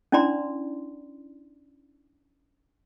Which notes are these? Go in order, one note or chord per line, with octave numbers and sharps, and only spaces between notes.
C#4 D4 E4 D5 A#5 C6